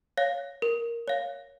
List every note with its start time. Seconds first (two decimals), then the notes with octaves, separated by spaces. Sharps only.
0.17 C#5 F5
0.62 A#4
1.08 C#5 F5